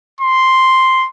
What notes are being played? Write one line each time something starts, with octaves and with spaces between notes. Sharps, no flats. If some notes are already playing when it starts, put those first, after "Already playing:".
C6